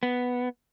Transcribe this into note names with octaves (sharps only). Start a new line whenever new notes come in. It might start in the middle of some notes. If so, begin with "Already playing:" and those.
B3